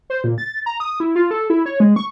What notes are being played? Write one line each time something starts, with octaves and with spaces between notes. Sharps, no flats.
C5
A#2
A6
A#5
D#6
E4
F4
A4
E4
C#5
G#3
C#6